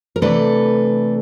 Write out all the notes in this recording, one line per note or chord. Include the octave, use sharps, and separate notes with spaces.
A#4
C3 E3 A3 D4 A4 B4